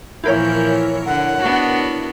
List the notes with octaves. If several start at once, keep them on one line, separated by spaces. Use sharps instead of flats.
A#2 E3 F3 E4 A#4 C#5 G6
D3 F#5
B3 D4 F#4